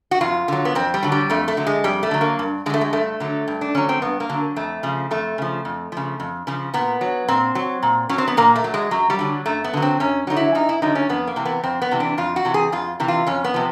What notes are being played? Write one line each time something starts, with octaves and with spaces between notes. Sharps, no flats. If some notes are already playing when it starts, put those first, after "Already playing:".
F#4
F2 F4
D3 F#3
B3
F2 C4
G3
D3 F#3
G3
F2 A3
A3
D3 F#3
G#3
F2 G3
A3
D3 F#3
A#3
G2
D3 F#3 G#3 A3
G#3
G2 A3
D3 F#3
G2
D4
D3 F#3 C#4
C4
G2 B3
A#3
D3 F#3
F2 A3
C#3 F3
F2 A3
C#3 F3
F2
C#3 F3
F2
C#3 F3
A#2 B3
F#3
A#2 C4
F#3
A#2
F#3 C#4
C4
B3
A#2 A#3
A3
F#3
G#3
F#2 F#3
G3
D3 F#3
F#2 A3
B3
D3 F#3
C4
F#2 C#4
D3 F#3 D#4
E4
F#2 D#4
E4
D3 F#3 D#4
C#4
F2 B3
A#3
C3 E3
B3
F2 C4
B3
C3 E3
D4
F2 F4
F#4
C3 E3
G#4
F2 F4
C3 E3
F4
F2 C#4
B3
C3 F3